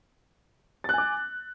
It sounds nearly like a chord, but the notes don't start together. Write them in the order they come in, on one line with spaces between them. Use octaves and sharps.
A6 F#6 G#5 D6